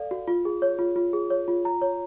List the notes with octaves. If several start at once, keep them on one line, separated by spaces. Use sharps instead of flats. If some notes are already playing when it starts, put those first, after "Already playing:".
Already playing: A4 D5 F5
F#4
F4
G#4
C#5
F4
F4
G#4
C#5
F4
A#5
C#5